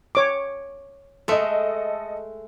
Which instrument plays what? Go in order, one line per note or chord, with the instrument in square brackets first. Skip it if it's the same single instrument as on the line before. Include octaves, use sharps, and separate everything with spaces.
[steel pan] C#5 D6
[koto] G#3 A3 E5 [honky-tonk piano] A4 D#5